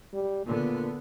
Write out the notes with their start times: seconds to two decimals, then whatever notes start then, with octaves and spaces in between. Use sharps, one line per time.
0.13 G3
0.46 A#2 D3 B3